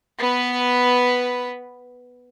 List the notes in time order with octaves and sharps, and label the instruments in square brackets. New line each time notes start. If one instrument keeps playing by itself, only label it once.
[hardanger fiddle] B3 B4